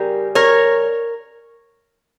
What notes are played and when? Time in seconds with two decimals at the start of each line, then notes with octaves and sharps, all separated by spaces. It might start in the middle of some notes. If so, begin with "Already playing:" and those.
Already playing: C#3 G3 G4 A#4
0.35 A#4 C#5